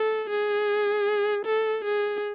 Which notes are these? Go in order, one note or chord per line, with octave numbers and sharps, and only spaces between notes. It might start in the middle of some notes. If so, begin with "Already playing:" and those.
Already playing: A4
G#4
A4
G#4